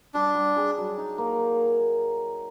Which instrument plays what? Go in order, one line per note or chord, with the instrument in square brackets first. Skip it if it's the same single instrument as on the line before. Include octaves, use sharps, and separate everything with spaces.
[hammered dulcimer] G3 [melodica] D4
[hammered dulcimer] G3
G#4
F#3
D#4
A#3